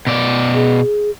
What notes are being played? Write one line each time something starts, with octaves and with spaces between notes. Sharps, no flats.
B2 D5
G#4